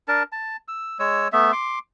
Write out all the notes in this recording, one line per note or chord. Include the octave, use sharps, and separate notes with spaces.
D4 A#4 A5
A5
E6
G#3 C#5 E6
A3 B3 E5
C6 D6